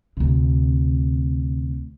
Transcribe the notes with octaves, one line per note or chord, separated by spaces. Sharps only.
D2 C3